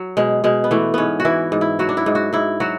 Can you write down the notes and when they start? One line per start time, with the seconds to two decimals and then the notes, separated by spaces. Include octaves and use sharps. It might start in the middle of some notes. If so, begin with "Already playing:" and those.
Already playing: F#3
0.17 B2 G#3
0.44 B2 G#3
0.64 B3
0.71 E3 A3
0.94 G#2 B3 C#4
1.20 F#4
1.25 E3 E4
1.52 G#2
1.61 E4
1.79 F#3 F#4
1.89 D4
1.97 E4
2.06 G#2
2.15 F#4
2.33 G#2 E4
2.60 F#3 F#4